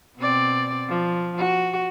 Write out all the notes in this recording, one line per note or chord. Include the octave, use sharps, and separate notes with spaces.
B2 C4 D5
F3
F#4